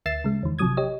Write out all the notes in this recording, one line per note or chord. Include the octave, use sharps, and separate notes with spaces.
D2 E5 A6 C7 E7
C#3 G#3
E2 D#3
A1 C3 F3 F#3 D#6 G#6
G4 C#5 D#5